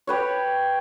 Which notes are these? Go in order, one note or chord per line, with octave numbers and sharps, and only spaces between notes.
G4 B4 C#5